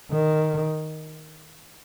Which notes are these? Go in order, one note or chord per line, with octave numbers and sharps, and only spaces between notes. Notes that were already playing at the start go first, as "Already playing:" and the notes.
D#3